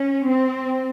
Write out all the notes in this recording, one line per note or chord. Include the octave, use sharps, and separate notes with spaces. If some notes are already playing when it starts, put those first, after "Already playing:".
Already playing: C#4
C4